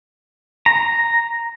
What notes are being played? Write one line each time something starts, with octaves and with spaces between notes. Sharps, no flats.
A#5